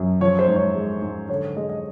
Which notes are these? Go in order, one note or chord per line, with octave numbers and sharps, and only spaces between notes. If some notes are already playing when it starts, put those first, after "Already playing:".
Already playing: F#2
F3 C#5
C5
G#2
C#5
G#3
G#2
D3 C#5
G#3 D#5
D#5